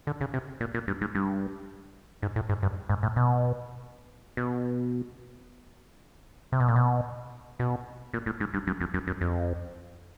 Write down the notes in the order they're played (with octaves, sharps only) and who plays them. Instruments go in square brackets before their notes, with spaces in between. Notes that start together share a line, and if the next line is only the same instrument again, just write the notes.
[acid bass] D3
C#3
C3
A#2
A#2
G2
G#2
G2
G#2
A2
G#2
G2
G#2
A2
B2
B2
C3
B2
A#2
B2
B2
A#2
A2
G#2
G2
F#2
F2
F#2
F#2
F2